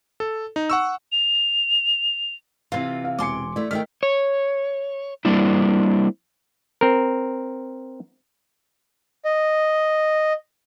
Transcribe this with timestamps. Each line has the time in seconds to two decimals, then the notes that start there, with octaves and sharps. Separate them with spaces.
0.20 A4
0.56 D#4
0.70 F#5 C#6 E6
1.12 F7
2.72 C3 E3 F4 F5
3.04 F5
3.19 E1 G#5 C6 D6 C#7
3.56 A3 E4 D5
3.71 D#3 A3 D#5 G5 F6 B6
4.03 C#5
5.25 G3 A#3 C4 D4 E4
6.81 C4 A#4
9.25 D#5